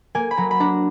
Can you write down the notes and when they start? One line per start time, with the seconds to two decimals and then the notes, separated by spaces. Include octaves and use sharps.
0.15 A#3 G#5
0.31 B5
0.37 F#3 A#5
0.51 B5
0.60 D4 A#5